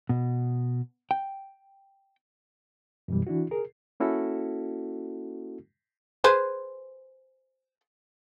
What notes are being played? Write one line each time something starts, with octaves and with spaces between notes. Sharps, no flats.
B2
G5
F#2 B2 E3 G3
E3 D4 E4 F#4
G#4 A#4
A#3 C#4 E4 F#4 A4
G#4 B4 C5